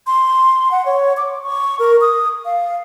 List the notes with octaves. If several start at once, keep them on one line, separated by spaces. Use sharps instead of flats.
C6
F#5
C#5
D6
C#6
A#4
D#6
F5